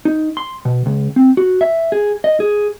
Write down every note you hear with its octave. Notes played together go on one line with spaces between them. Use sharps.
D#4
C6
B2
C#2
C4
F#4
E5
G#4
D#5
G#4